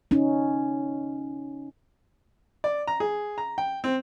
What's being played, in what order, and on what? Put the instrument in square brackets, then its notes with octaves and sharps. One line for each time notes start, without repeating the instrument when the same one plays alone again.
[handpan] C#4 D#4
[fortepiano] D5
A#5
G#4
A#5
G5
C4